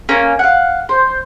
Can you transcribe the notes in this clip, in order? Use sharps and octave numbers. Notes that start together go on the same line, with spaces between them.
A#3 C#4
F5 F#5
C5